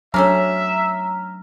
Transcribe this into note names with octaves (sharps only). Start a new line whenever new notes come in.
F#3 A3 C#4 D4 E5 A#5 F6